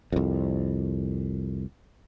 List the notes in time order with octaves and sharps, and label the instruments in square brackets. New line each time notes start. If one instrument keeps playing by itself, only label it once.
[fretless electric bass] C2 F2